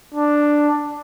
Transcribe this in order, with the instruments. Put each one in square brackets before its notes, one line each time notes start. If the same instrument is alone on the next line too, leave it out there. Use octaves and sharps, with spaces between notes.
[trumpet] D4